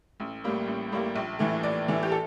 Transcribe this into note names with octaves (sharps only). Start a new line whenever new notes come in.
A1
A2 G3 A#3
A1
A2 G3 A#3
A#1
A2 E3 A3
A#1 D5
A2 E3 A3
G4
A4